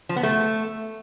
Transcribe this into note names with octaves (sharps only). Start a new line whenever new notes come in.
F3
B3
A3